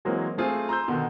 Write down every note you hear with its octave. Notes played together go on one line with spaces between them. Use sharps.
E3 F#3 G#3 A#3 C4
A3 C4 F4 G#4
A#5 C6 E6 G6
B2 D3 D#3